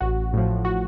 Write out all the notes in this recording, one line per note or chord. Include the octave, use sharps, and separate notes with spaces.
A1 F#4
A2 F3
F#4